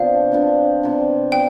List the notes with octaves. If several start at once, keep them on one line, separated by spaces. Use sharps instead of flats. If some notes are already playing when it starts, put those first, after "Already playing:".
Already playing: C3 F3 B3 D4 F5
C3 F3 B3 D4
C3 F3 B3 D4
G3 B3 G5